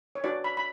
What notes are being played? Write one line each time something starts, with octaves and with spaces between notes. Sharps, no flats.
C#5
D4 F#4 B4 D5
B5
B5